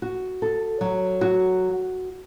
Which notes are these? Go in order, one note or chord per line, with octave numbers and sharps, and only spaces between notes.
F#4
A4
F#3
F#4